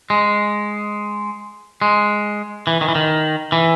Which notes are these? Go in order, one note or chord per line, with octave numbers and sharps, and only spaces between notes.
G#3
G#3
E3
D#3
E3
D#3
E3